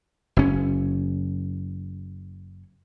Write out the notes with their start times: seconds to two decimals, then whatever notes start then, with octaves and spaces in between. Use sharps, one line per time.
0.37 F#1 C#4